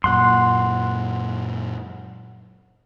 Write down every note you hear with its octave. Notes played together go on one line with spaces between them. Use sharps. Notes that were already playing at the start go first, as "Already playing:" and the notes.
F#2 A#2 F#5 C6